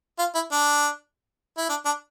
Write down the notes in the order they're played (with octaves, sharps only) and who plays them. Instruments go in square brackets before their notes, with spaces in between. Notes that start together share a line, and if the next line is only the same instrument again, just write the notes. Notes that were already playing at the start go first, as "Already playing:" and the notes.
[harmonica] F4
E4
D4
E4
D4
D4